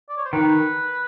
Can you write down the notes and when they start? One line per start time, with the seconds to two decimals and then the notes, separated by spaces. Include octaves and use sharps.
0.09 D5
0.17 C#5
0.25 C5
0.33 D#3 B4